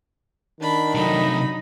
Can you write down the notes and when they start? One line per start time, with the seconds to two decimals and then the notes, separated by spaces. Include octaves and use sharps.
0.61 D#3 D4 B5
0.94 C3 F#3 A3 D#4 B5